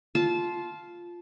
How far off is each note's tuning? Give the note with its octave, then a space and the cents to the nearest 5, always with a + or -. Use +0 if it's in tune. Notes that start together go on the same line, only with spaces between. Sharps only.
F4 +0 A5 -20